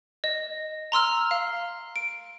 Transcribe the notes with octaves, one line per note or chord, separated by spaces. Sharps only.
D#5
A#5 C6 E6 F6
F5
D7